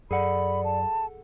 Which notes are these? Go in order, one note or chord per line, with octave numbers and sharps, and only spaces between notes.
F#2 G#4 A4 D5 F#5 B5
A5